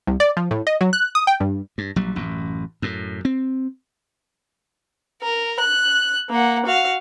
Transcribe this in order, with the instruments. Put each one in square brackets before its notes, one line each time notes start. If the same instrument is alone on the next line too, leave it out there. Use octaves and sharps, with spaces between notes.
[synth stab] C2
D5
F3
A2
D#5
F#3
F#6
D#6
G5
G2
[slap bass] G2
A#1 F#3 G3
A1 F#2
F#2 A2
C4
[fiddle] A#4
F#6
A#3 F#5
F#4 F5